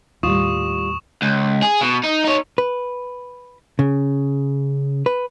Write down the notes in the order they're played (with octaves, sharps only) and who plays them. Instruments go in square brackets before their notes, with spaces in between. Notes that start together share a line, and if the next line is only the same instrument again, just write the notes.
[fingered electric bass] D#2 A2 [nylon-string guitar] G3 F4 [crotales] C#6 D#6 E7
[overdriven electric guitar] C#2
G#4
B2
D#4
D#4 C#5
[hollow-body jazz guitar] B4
C#3
B4